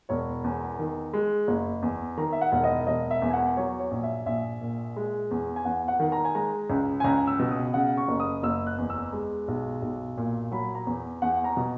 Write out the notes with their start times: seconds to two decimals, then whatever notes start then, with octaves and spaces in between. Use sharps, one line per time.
0.09 E1 C#5
0.44 E2
0.79 D#3
1.13 G#3
1.48 F#1
1.82 E2
2.17 D#3 A#5
2.33 E5
2.41 F#5
2.52 E1
2.64 D#5
2.87 E1 D#5
3.11 E5
3.22 E2
3.30 G#5
3.33 F#5
3.57 F#3 C#5
3.79 C#5
3.91 A#1
4.03 E5
4.26 A#1 E5
4.62 A#2
4.96 G#3
5.31 E2
5.56 G#5
5.65 E2 F#5
5.88 F#5
6.00 D#3
6.12 A#5
6.25 G#5
6.35 G#3 A#5
6.70 C#2
7.00 G#5
7.04 C#2 A#5
7.27 E6
7.39 B2
7.51 D#6
7.74 C#3 F#5
7.97 C#6
8.08 F#1
8.20 D#6
8.43 F#1 E6
8.67 F#6
8.78 E2
8.90 E6
9.13 G#3
9.48 B1
9.82 B1
10.17 A#2
10.51 F#3 B5
10.75 A#5
10.87 E2
11.22 E2 F#5
11.44 A#5
11.57 B2